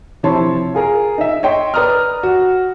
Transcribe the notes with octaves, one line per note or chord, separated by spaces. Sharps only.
C3 F3 E4 C#5 A5 C6
F4 G#4 A#4
D#4 E5
C#5 D#5 G5 C6
B4 D5 A#5 D#6 F6
F#4